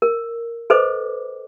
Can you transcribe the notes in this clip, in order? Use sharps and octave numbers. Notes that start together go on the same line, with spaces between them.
A#4
A4 B4 C5 D#5 D6